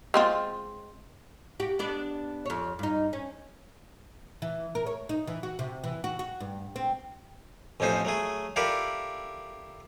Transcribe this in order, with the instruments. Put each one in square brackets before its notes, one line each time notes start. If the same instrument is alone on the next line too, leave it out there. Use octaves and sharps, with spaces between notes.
[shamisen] G#3 C4 F4
[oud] F#4 G4
B3 D4 D5
F2 C#5
G2 D#4
C#4
E3
A#4
C#5
D#4
E3
F#4
C3
E3
F#4
F#4
G2
C4
[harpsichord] A1 F2 C#4 D#4 C5
F#3 A3 G#4
E4 F4 G4 A4 A#4 D5